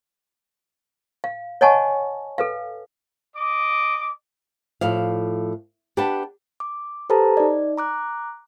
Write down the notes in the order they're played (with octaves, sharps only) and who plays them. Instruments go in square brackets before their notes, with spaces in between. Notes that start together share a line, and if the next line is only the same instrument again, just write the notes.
[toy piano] F5
C#5 D#5 F#5 G#5 A5 C#6
A4 B4 F5
[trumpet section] D#5 D6
[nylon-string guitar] A2 F3 D5 F5
D4 G4 B4 F#5 G5 A5
[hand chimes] D6
G4 A4 B4 C5 A5 A#5
D#4 D5
A#5 D6 F#6